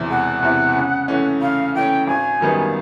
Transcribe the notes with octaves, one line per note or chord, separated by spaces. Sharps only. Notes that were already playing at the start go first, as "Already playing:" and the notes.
Already playing: E1 E2 C3 E3
E1 F#5
E2 C3 E3
C#3
E3 A3 C#4
C#3 F5
E3 A3 C#4 G5
G#1 G#5
F#2 D#3 G3 B3